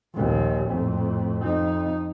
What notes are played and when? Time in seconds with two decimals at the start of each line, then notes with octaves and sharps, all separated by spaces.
0.15 A#1 D#2
0.70 F2 A2
1.44 F2 D#4